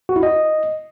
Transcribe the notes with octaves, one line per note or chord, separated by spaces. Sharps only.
F#4
E4
D#5